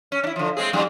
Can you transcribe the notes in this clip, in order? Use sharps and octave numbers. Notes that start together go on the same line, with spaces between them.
C#4
D4 E4
D3 F3
G#3 C4 G#4
F2 G#2 G3